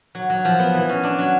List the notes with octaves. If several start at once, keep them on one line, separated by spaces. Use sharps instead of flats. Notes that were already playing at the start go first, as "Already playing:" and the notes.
F#3
F#3
F3
B3
E3
C#4
D4
F#3